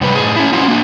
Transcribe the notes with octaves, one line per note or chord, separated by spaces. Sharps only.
F#2 C3 G3 B4
A2 G#4
C#4 E4
C#4 F4 F#4
A#3 D4